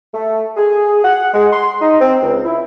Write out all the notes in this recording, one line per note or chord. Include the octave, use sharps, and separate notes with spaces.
A3
G#4
F#5
G#3
C6
D#4
C4
C#2
E4